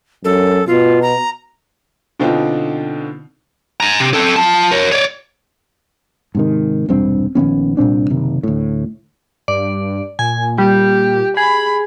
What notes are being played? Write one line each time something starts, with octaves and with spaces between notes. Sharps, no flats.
F#2 A4
B2 F4
A#5
B2 D3 C4 D#4 F4
G#5 A#5
C3
C4 A4
F4 A5
A#4 C#5
C#5 D5
G#2 C3 D#3
E1 C2 G2 C4
A#1 D#3 B3 C#4
C2 A#2 C4 D4
F#1 C3 D#3
D2 A2
G2 D5
A#2 G#5
G3 G4
G#4 B5